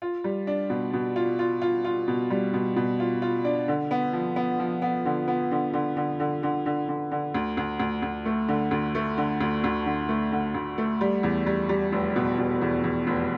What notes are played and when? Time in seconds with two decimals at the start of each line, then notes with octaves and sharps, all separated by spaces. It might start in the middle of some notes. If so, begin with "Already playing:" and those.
0.02 F4
0.24 G3
0.47 D4
0.70 B2
0.93 B2
1.16 F4
1.39 F4
1.62 F4
1.85 F4
2.08 B2
2.30 G3
2.54 B2
2.76 B2
3.00 F4
3.22 F4
3.44 D4
3.68 D3
3.91 B3
4.13 F3
4.36 B3
4.59 F3
4.82 B3
5.05 D3
5.28 B3
5.51 D3
5.74 D3
5.97 D3
6.20 D3
6.43 D3
6.66 D3
6.89 D3
7.11 D3
7.35 D2
7.57 D2
7.80 D2
8.02 D2
8.25 A3
8.48 D3
8.71 D2
8.95 A3
9.18 D3
9.41 D2
9.64 D2
9.86 D3
10.09 A3
10.32 D3
10.54 D2
10.78 A3
11.01 G3
11.23 E2
11.47 G3
11.69 G3
11.92 F1
12.16 B2
12.38 B2
12.61 E2
12.84 E2
13.07 F1